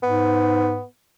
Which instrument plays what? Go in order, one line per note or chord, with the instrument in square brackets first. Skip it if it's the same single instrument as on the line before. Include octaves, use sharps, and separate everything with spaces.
[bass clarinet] G#2 [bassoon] B3